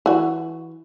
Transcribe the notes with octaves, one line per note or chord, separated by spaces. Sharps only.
E3 F#4